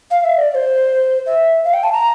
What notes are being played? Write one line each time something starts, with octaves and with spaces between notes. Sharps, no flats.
F5
E5
D5
D5
C5
E5
F5
G5
A5
A#5